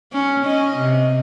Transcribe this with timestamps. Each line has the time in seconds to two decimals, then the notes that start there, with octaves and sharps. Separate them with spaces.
0.13 C#4
0.45 C#4 D#5
0.77 C3